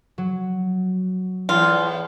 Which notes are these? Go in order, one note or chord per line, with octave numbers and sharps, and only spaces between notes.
F#3
E2 A2 F4